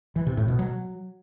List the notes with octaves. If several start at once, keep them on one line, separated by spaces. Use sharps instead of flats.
E3
C3
A2
B2
F#3